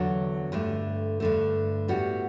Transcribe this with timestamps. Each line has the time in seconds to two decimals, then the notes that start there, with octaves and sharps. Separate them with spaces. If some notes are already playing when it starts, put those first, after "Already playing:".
Already playing: E2 D3 F#3
0.52 G2 D3 A3
1.20 G2 D3 A3
1.88 A2 G3 B3 F#4